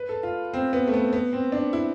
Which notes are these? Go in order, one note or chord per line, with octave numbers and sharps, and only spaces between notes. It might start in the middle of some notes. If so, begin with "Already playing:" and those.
Already playing: B4
A4
F4
C4
B3
A3
B3
B3
C4
D4
E4